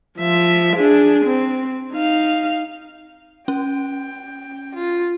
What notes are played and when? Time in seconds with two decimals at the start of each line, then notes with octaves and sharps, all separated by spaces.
0.18 F3 E5
0.77 D4 G#4
1.25 C4
1.93 D#4 F5
3.48 C#4 G5
4.75 F4